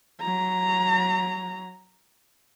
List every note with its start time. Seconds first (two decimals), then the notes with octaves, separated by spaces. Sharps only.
0.21 F#3 A#5